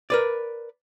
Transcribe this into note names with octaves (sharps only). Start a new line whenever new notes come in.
A#4 B4 D5